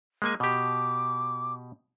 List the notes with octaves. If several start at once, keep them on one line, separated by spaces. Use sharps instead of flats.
G#3 A#3 G#5
B2 G4 D6